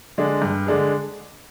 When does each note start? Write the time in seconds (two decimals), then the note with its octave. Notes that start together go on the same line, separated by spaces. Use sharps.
0.18 D3 G#3 D4 G#4
0.42 G2
0.67 D3 G#3 D4 G#4